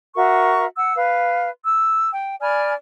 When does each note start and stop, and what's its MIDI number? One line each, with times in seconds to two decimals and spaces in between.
0.16 0.65 66
0.16 0.65 70
0.16 0.65 76
0.16 0.65 85
0.76 0.96 78
0.76 0.96 88
0.96 1.49 71
0.96 1.49 77
1.64 2.09 88
2.12 2.35 79
2.41 2.74 74
2.41 2.74 80
2.41 2.74 83
2.41 2.74 89